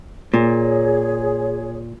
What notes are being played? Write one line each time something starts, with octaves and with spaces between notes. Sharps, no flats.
A#2 G#4 C#5